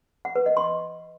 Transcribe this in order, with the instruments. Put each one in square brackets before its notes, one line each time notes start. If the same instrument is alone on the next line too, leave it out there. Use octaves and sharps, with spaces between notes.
[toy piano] F#5
B4
D#5
C6